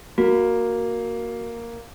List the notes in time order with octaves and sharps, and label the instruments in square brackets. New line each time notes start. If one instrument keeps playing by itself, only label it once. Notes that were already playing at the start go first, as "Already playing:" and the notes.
[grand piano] A#3 [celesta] F#4